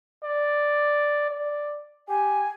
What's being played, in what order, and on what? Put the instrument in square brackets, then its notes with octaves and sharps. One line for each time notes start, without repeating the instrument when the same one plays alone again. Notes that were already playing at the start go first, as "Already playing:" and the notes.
[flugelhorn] D5
D5
[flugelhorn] G4 [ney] G#5